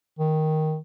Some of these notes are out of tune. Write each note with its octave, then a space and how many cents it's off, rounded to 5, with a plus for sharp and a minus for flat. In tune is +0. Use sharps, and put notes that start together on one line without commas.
D#3 +5